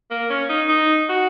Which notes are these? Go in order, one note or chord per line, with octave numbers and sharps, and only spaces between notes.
A#3
C#4
D#4
D#4
F#4